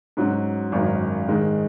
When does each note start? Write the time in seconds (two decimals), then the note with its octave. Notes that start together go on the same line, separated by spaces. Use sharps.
0.17 G#2 F#3 C#4 F#4
0.72 G#1 F#2 D#3
1.28 G#2 D#3 G#3 D#4